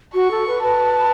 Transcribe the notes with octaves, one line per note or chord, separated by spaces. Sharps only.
F#4 C#6
A4
B4
B4 A5